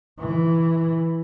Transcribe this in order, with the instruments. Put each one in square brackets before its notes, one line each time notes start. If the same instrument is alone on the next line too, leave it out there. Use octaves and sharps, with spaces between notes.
[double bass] E3